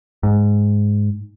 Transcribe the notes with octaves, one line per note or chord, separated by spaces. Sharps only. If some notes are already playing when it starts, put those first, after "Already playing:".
G#2